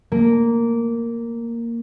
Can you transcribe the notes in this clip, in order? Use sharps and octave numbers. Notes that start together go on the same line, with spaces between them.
A#3